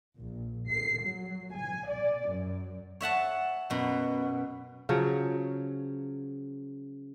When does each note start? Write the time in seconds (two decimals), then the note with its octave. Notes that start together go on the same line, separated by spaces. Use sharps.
0.19 A#1
0.68 C7
1.03 F#3
1.54 G#5
1.88 D5
2.33 F#2
3.01 C#5 E5 F#5 A5
3.70 F#2 B2
4.89 C#3 F3 F#3